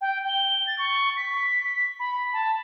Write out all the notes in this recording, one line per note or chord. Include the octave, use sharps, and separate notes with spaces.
G5
G7
A6
C#6
B6
B5
A5